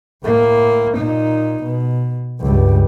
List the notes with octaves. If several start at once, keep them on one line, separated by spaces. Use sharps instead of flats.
A2 A#3
A#2 D#4
B2
C#2 G2